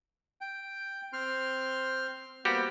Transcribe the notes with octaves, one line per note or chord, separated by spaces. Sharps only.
G5
C4 C6 F6
G3 A#3 B3 F#4 G4 C5